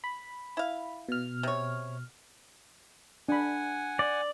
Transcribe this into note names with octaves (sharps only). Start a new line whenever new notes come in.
B5
E4 F5
B2 F6
C3 C#5
D4 F#5 G#5 B5
D5